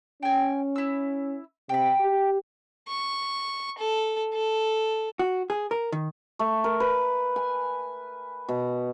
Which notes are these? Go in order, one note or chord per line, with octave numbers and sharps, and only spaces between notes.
C#4 G5 G#5
E4 E6
C3 G5 B5
G4
C#6
A4
A4
F#4
G#4
A#4
D#3
A3
A#4
B4
G#5
B2